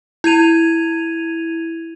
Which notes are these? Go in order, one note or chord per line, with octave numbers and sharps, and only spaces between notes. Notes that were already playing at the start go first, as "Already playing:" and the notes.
E4 G#6 D#7 F7